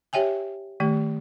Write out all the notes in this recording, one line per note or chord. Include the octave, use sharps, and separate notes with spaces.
G4 C#5 E5 G5 G#5
D#3 A3 G4